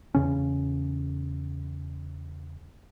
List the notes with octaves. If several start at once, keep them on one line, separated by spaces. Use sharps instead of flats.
E2 C#3 C#4